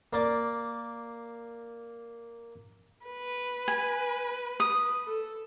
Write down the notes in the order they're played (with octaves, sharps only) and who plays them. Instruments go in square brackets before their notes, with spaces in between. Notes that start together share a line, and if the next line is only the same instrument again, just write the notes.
[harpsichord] A#3 D5
[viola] B4
[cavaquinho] G#5
D#6
[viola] A4